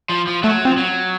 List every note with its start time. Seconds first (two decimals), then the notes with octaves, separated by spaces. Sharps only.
0.09 F3
0.27 F3
0.43 F#3 A3
0.65 F3 C4
0.77 F#3